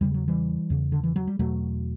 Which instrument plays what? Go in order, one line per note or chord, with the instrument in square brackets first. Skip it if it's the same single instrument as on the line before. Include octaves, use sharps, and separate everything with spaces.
[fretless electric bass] E2 C#3 G3
F#3
E3 G3
E2 C#3
D3
E3
F#3
G3
E2 B2 F#3 A3